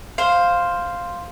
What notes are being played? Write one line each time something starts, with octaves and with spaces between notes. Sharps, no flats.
C5 F5